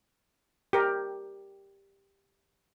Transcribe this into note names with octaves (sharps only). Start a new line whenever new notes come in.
G4 A#4